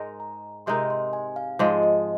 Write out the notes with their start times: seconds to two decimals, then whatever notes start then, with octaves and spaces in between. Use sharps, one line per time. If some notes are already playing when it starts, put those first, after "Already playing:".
Already playing: G#2 G#3 D#4 A#4
0.20 A#5
0.66 C3 G#3 D#4 A#4 C6
0.90 C6
1.13 G#5
1.36 F5
1.59 G#2 F3 G#3 D#5
1.83 D#5